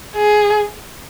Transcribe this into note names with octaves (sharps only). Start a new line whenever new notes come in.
G#4